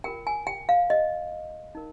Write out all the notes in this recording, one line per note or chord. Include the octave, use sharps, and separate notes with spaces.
F4 A#4 G5
G#5
G5
F5
D#5
D#4 A#4